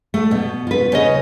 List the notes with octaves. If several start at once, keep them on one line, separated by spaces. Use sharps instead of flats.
A3
B2
F4 B4
C#3 C#5 D#5